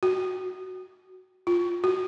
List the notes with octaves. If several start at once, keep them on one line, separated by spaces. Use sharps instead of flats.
F#4
F4
F#4